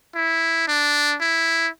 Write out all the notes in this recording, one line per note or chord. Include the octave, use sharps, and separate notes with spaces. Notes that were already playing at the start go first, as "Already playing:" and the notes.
E4
D4
E4